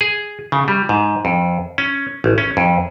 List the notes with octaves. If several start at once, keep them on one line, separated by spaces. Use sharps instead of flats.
G#4
C#3
G3
G#2
F2
C#4
A1
C#4
F2